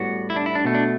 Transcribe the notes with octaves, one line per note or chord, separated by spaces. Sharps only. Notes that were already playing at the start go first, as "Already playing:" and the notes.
Already playing: A2 G3 B3 F#4
E4
D4
E4
D4
B2 A3
D4